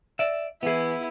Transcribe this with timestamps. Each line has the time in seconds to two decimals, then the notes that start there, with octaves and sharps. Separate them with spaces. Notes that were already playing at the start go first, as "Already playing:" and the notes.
0.19 D5 E5
0.63 E3 B3 E4 G#4